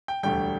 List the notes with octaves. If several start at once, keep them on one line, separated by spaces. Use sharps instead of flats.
G5
E1 D2 D3 G3 G5